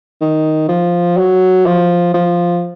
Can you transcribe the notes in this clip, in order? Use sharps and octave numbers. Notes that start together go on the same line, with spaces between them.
D#3
F3
F#3
F3
F3